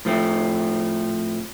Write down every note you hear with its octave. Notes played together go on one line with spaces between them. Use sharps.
A2 F3 A3 C4